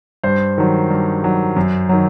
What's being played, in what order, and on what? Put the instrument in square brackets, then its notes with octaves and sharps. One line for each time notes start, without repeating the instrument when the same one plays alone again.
[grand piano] G2 C5
D#3 F#3
G2
D#3 F#3
F#2
D#3 F#3